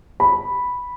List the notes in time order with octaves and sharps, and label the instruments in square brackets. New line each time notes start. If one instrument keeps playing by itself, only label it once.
[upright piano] B5